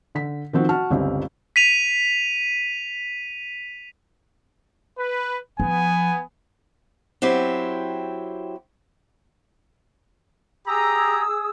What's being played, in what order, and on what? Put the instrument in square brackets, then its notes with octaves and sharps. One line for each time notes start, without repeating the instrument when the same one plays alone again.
[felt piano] D3 B6
D#3 F3 C4 F#4
F#4 A5 F6
G1 C#2 G3 C4
[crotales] B6 D#7 F7
[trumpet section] B4
[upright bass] F3 [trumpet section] B3 G#5
[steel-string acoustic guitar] F#3 C4 E4 G4
[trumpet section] G4 A#5 [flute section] G#4 D#6 E6